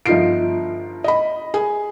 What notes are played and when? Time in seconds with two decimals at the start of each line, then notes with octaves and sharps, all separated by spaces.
0.06 G1 F3 D#4 F4 C7 D7
1.04 D#5 B5
1.54 G#4